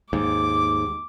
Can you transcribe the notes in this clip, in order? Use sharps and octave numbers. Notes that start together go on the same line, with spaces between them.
D#2 G#2 D6